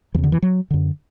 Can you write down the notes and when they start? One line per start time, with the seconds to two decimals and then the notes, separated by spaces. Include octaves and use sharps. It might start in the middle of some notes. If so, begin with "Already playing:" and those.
0.15 E2 E3
0.18 C#3
0.24 D3
0.32 E3
0.42 F#3
0.71 F#2 D3